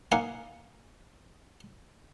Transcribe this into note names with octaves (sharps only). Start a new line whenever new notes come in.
A#3 D#4 F5 F#5 G#5